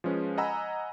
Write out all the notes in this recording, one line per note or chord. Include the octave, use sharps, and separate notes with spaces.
F3 G#3 C#4 B4
D#5 F#5 G#5 A#5 B5 E6